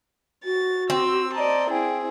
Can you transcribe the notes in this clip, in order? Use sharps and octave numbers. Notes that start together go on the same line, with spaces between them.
F#4 A6
C4 E6
D5 D#5 A5 A#5
C4 E4 G#4 G5